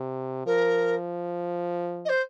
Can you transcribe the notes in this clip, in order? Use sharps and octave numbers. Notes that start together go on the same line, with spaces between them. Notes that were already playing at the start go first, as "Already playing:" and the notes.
Already playing: C3
F3 A#4
D#5
C5